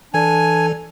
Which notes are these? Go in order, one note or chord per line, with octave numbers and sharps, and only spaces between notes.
E3 D4 A4 G#5